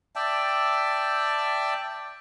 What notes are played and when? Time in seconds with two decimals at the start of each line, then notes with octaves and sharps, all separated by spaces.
0.16 D5 E5 G5 A5